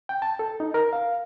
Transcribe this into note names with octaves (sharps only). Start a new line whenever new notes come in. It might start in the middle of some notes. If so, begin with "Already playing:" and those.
G5
A5
A4
D#4
A#4
F5